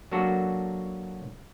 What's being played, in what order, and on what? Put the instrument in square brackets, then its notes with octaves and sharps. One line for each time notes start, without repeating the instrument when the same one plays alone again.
[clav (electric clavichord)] F#3 A#3 D4 F#4 A4